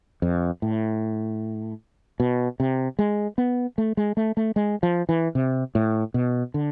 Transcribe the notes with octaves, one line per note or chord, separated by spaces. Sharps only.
F2
A2
B2
C3
G#3
B3
A3
G#3
A3
A3
G#3
F3
E3
C3
A2
B2
D3